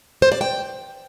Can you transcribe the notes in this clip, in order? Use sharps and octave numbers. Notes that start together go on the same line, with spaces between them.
C5
D5
G5